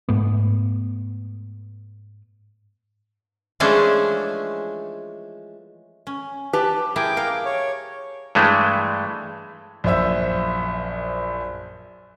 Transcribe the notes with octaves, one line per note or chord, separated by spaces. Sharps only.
G#2 A3 B3
E3 F3 G#3 A3 C#4 D4
C#4
G4 B4 A5
E4 G#4 A#4 G5 D6
A#4 F5
C#5
G2 E3 G#3 A3
A#1 F#2 C5 E5 E6